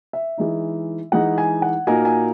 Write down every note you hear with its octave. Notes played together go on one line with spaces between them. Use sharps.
E5
E3 G#3 D#4
E3 G#3 D#4 F#5
G#5
F#5
A#2 A#3 D#4 F#4 A#4 G#5
G#5